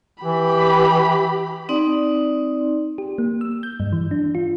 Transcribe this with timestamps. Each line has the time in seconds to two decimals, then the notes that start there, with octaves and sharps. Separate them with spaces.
0.24 E3 G4 B5
1.69 C4 D#4 D5
2.98 G4
3.18 A#3
3.41 E6
3.63 G6
3.80 G2
3.93 E3
4.11 D4
4.35 F4